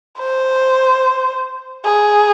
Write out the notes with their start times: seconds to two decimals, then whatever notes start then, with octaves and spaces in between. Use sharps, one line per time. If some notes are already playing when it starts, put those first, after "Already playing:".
0.19 C5
1.85 G#4